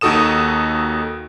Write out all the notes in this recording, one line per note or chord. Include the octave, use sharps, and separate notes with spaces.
D#2 D#4 F#4 A4 D#6 E7